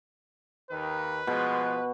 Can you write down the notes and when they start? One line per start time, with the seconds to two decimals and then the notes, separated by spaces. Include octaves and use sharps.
0.71 D#2 D#3 B4
1.27 B2 F3 G#3